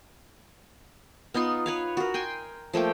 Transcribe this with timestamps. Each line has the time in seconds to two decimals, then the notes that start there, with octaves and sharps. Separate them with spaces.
1.34 B3 D#4 F4 C6
1.66 B4 C#5 F5
1.97 F#4 A#4
2.14 G5 G#5 C6
2.73 F3 A3 A#3 G5